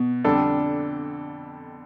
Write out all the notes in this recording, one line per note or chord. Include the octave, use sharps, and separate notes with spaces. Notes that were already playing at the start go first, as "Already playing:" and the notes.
Already playing: B2
F2 D3 G3 D4 A4